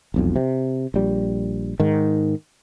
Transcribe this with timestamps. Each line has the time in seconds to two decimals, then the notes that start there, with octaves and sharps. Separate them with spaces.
0.14 E1 B1 F2
0.36 C3
0.94 A#1 G3
1.80 G#2 D#3